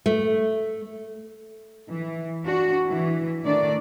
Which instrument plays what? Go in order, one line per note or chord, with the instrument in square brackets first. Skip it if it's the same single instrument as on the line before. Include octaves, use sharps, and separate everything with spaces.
[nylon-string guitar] A3
[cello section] E3
D4 F#4
E3
D#3 A3 D4 D5